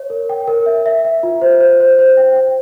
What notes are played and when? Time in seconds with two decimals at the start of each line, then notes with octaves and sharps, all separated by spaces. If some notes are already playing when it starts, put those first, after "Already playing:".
Already playing: C#5
0.10 A#4
0.29 G5
0.47 A#4
0.66 E5
0.86 E5
1.05 E5
1.23 F4
1.41 C5
1.60 C5
1.80 C5
1.99 C5
2.17 G5
2.36 G5